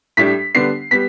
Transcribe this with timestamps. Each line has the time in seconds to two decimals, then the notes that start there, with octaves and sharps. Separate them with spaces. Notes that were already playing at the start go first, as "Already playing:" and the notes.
0.17 A2 G3 D4 B6
0.55 D3 G3 B3 D4 C7
0.91 G3 B3 B6